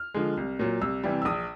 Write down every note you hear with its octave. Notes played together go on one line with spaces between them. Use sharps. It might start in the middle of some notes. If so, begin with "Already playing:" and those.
Already playing: F6
D3 F3 G#3
C2
A#2 F#3
C2 E6
C3 E3 G3
E6
A#1 D#6